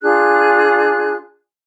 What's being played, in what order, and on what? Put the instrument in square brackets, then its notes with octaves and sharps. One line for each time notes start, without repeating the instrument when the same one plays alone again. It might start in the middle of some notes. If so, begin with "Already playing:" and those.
[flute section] D4 F4 G#4 F#6